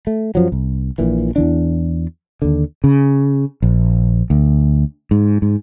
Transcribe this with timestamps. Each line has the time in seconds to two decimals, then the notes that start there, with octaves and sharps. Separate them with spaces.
0.07 A3
0.35 F#2 F3 F#3
0.52 C2
0.98 A#1 A#2 E3
1.36 E2 E3 D4
2.42 D#2 D3
2.84 C#3
3.62 A#1
4.30 D2
5.11 G#2
5.42 G#2